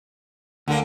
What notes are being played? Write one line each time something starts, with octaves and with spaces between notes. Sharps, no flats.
D2 D3 A#3